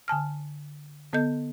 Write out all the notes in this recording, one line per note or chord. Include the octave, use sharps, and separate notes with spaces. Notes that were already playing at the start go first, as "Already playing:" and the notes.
D3 G#5 A5 F6
D3 B3 A4 D#5 G6